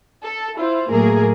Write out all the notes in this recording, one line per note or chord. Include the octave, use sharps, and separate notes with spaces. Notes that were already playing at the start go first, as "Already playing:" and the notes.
A4
E4 F4 C5
A2 F#3 A3 A#3 G#4 A#4